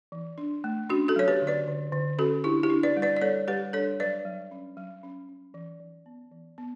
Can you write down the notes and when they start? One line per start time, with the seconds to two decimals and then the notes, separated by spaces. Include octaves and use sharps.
0.12 E3
0.38 D4
0.64 A3
0.89 C#4 D4 F#4
1.08 F#4 A4
1.16 F#3 C#5
1.28 G4 B4
1.42 D3
1.47 B4 D5
1.68 D3
1.92 D3
2.19 C#4 F#4 A4
2.44 D4 E4 G4
2.63 E4 G4
2.70 D4
2.83 B4 D5
2.97 G3
3.02 B4 D5
3.17 D5
3.22 G3 A4 C#5
3.48 G3 G4 B4
3.73 D4 A4 C#5
4.00 F#3 B4 D5
4.25 F#3
4.51 C#4
4.77 F#3
5.03 C#4
5.29 C#4
5.54 E3
5.80 E3
6.06 B3
6.32 E3
6.58 B3